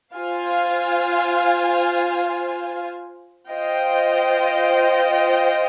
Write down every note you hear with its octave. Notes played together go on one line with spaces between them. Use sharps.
F4 C5 F5 G#5
F4 C5 D#5 G5